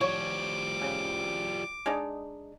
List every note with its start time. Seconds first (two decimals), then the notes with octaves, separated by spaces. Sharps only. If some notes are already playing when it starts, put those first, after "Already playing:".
0.01 F3 G3 C#5 D6
0.82 C#3
1.86 G#3 D4 D#4